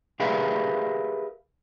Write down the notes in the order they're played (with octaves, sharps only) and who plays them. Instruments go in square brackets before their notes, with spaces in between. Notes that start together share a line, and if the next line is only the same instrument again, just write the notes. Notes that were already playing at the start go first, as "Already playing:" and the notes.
[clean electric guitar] G4 G#4 A#4 B4 E5 F5